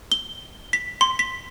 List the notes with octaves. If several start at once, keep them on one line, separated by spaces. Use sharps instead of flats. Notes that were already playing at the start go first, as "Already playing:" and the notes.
G7
B6
C6
B6